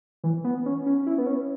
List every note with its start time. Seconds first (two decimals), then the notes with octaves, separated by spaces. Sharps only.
0.24 E3
0.44 B3
0.66 C#4
0.86 C#4
1.07 E4
1.18 B3
1.27 C#4